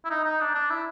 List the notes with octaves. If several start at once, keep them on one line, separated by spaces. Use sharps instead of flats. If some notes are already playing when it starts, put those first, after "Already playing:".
E4
D#4
D#4
D4
D4
E4